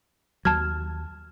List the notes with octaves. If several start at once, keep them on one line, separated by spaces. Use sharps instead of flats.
D#2 F#3 A5 F6 G#6